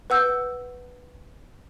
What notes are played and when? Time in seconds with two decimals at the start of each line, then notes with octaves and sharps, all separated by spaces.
0.10 B4 F#5 E6 G6